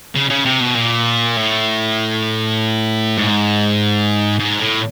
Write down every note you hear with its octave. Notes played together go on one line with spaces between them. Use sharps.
C#3
C#3
C3
B2
A#2
A2
G#2
G#2
A2